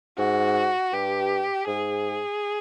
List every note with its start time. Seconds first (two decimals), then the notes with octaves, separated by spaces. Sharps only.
0.18 G#2 F#4
0.93 G2 G4
1.68 G#2 G#4